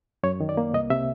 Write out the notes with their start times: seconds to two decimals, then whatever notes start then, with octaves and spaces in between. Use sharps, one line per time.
0.23 F#2 C#5
0.40 D#3
0.49 D5
0.57 A#3
0.74 C2 D#5
0.90 C3 E5